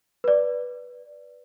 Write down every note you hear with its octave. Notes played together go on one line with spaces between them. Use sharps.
B4 D5